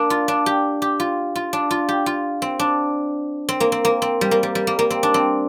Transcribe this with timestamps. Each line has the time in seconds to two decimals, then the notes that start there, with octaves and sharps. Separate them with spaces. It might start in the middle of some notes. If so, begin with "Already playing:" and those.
Already playing: A#3 D4
0.10 F4
0.28 D4
0.46 G4
0.82 G4
1.00 F4
1.35 F4
1.53 D4
1.71 F4
1.89 G4
2.06 F4
2.42 C4
2.59 D4
3.49 C4
3.60 A#3
3.72 C4
3.85 A#3
4.02 C4
4.21 G3
4.31 A#3
4.43 G3
4.55 G3
4.67 A#3
4.79 A#3
4.90 C4
5.03 D4
5.14 C4